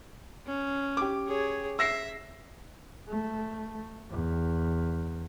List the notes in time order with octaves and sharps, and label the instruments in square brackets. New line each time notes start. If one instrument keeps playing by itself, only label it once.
[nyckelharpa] C#4
[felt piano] G4 D6
[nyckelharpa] G#4 C#5
[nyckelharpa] E5 [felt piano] E6 A#6 C7
[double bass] A3
E2